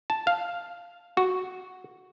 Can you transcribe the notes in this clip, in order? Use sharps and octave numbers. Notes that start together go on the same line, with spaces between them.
A5
F5
F#4